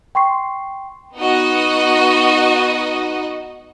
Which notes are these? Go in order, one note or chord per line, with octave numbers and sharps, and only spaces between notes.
G5 C6 C#6 C7
B3 D#4 F#4 D#5 F#5